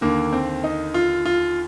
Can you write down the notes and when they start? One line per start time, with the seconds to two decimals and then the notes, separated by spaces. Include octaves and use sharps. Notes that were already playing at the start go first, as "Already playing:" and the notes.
0.01 D#2 D3 A#3
0.33 C4
0.64 D#4
0.94 F4
1.25 F4